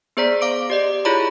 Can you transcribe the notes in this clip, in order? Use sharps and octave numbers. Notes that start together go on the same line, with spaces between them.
B3 G#4 C5 D5 A#5 B6
F5 D6 D7
G4 D5 D#5
E4 F4 G#4 C#5 A#5 B5